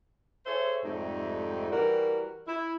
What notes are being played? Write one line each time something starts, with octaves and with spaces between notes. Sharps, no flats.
G#4 A4 C5 C#5 E5
F2 G#2 C3 G3 A3 D#4
E3 G3 F#4 A#4
E4